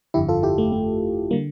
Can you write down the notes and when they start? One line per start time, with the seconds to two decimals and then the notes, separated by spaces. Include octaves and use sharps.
0.14 G1 F2 D3 E4 G4
0.28 F4 A4
0.43 E4 G4
0.58 A3
0.72 A3
1.31 D3 G3 A#3